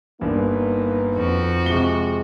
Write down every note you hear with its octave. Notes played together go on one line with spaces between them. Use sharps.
G1 G2 A#3 D#4 B4
F2 F#4
C3 G#3 G7